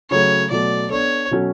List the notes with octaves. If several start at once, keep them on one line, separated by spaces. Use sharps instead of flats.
C#3 F#3 A3 C#5
B2 F#3 A3 D5
B3 D4 A4 C#5
B2 F#3 C#4 F#4 A4